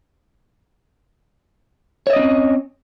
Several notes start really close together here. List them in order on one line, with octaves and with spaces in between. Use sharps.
C#5 E5 D#5 C#4 C4